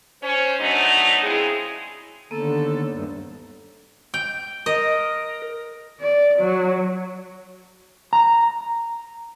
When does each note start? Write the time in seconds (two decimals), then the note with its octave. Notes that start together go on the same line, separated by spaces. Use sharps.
0.23 C#4 C5
0.60 F#3 A3 B3 D4 D#4
1.23 C#3 G#3 C4 E4 G#4
2.31 D#2 D3 A#3 B3 A4
2.92 D2 G2
4.14 G5
4.66 A#4 D#5
6.01 D5
6.38 F#3
8.13 A#5